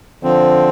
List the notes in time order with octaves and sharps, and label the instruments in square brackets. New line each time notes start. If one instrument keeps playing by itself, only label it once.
[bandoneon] D3 F3 C4